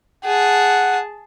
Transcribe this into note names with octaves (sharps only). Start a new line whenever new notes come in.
G#4 F#5 A5